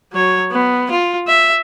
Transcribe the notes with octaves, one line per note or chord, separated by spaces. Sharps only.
F#3 C#5
B3
F4
E5